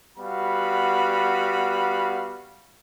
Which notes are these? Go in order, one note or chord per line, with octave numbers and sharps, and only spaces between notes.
G3 B3 F#4 F5 B5